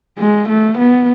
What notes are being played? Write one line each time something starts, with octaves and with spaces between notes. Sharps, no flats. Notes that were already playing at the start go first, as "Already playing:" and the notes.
G#3
A3
B3